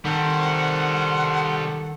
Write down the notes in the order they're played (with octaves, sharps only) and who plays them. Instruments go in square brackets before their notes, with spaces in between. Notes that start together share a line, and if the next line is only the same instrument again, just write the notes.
[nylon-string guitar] D#3 [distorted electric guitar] G3 C4 [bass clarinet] A4 [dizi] F#5